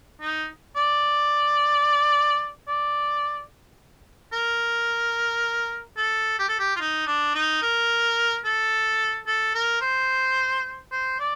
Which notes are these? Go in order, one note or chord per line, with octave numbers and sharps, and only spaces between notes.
D#4
D5
D5
A#4
A4
G4
A4
G4
F4
D#4
D4
D#4
A#4
A4
A4
A#4
C5
C5
D5